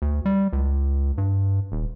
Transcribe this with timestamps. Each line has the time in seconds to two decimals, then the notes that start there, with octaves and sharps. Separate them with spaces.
0.02 D2
0.26 G3
0.53 C#2
1.18 G2
1.72 D#1